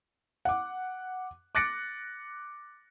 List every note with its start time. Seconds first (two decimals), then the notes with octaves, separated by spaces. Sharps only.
0.45 F#5 D6
1.55 D6 F#6 A6 A#6 C#7 D7